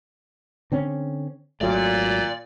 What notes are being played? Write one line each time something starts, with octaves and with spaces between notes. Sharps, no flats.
D3 C4 C#4
G#1 A#2 F#3 A3 D5